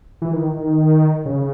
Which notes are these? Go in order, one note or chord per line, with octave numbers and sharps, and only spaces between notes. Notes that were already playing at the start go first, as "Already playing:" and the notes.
E3
D#3
D#3
C#3